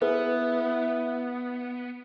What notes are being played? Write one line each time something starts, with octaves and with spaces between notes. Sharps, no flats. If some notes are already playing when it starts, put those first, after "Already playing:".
B3 E4 G#4 B4